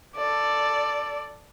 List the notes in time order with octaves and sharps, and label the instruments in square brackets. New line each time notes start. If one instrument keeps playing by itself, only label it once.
[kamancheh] A4 D5